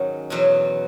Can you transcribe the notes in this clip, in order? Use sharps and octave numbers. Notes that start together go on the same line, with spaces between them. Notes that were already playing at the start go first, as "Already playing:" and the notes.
Already playing: G#2 D#3 F#3 C#4
E2 B2 F#3